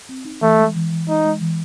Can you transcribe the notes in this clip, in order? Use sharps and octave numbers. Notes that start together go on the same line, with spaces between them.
C4
D#4
E3 A3
G#3
E3
E3
G#3 D#4
G#3
E3